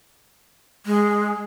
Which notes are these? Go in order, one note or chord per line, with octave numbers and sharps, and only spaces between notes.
G#3